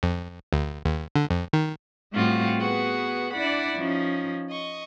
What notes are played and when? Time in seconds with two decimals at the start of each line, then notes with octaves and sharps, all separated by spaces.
0.03 F2
0.53 D2
0.85 D#2
1.16 D3
1.30 F2
1.53 D#3
2.12 A2 G3 C4 F4 F#4 F5
2.57 B3 F#4 G#4 B4
3.32 D4 E4 D5 F#5 B5
3.75 F3 C#4 D#4
4.49 D#5 C#6